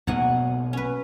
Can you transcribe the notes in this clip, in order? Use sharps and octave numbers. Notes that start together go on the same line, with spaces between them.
B1 B2 F#3 A#3 F#5 G#5
C#4 B4